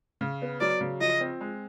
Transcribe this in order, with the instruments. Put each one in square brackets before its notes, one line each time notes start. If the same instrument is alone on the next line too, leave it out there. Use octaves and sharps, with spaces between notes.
[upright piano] C#3
B3
[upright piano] F#3 [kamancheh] D5
[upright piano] C#3
[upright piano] F3 [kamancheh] D#5
[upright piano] C4
G#3